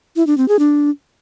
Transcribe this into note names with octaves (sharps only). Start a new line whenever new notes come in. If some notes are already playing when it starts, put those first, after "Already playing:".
E4
D4
C4
G#4
D4